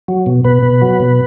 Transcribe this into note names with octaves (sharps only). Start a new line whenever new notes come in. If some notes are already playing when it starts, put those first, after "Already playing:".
F#3
B2
B2 B4
B2
F#3
B2